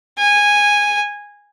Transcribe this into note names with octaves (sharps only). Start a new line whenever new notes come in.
G#5